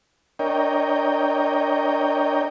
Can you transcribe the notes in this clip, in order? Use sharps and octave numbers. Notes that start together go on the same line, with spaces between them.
D4 A#4 C#5 D#5 G5